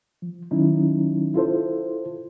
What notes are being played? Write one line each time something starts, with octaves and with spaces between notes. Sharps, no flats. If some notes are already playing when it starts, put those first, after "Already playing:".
F3
D#3 F#3 C#4 D#4 E4
E4 F4 A4 C5